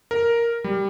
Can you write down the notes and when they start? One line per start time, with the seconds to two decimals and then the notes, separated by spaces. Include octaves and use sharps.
0.11 A#4
0.64 G3